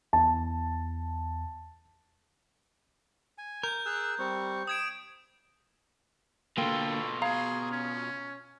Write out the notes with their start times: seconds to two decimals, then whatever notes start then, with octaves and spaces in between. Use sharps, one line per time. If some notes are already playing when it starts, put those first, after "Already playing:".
0.13 E2 A5
3.38 G#5
3.63 A#4 G6
3.86 G#4 E6 F#6
4.19 G3 C4 C#6
4.67 D#6 G#6 D7 E7
6.58 B2 D3 A#3 F4 A4 G5
7.22 G#4 F5 A#5
7.72 C#4